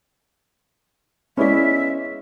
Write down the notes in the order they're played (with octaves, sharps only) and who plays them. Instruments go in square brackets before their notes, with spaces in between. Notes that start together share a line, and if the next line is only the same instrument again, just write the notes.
[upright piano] G#3 B3 E4 [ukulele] C#4 D5 [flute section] E5